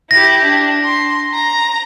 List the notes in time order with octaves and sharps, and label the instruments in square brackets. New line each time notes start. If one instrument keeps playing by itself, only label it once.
[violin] E4 G4 [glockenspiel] A#6
[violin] D4
C6
A#5